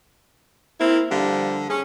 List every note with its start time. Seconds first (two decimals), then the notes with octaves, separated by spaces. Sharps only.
0.80 A#3 C4 E4
1.11 D3 F3 G3 A#3
1.70 C#4 G#4